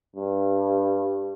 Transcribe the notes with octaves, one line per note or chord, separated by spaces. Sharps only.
G2